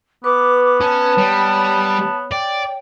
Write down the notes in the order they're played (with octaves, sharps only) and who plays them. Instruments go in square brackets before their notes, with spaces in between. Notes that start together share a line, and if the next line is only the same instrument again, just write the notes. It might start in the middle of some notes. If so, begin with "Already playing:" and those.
[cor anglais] B3 [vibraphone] B4 [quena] D6
[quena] D6
[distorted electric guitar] C#4 [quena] A5
[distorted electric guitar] G3 [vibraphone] C#5
[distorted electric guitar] D5 [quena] G5